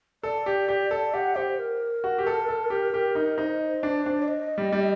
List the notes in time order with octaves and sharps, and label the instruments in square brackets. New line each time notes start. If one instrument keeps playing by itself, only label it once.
[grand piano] A4 [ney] D5
[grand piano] G4
G4
A4
[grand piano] G4 [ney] F#5
[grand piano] G4 [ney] C5
[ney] A#4
[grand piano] F#4
G4
A4
A4
G4
G4
D#4
[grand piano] D#4 [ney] C5
[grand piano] D4
D4
[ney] D5
D#5
[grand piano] G3
G3